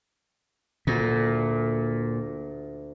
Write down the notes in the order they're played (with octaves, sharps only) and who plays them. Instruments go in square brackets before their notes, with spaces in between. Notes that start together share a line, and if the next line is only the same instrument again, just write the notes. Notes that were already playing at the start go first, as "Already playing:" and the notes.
[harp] D2 [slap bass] A#2